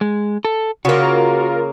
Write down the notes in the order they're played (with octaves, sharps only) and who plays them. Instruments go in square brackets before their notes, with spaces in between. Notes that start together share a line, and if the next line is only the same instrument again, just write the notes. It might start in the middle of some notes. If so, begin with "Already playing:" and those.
[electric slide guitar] G#3
A4
[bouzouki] C#3 A#3 [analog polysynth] F4 A#4 [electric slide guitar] F#4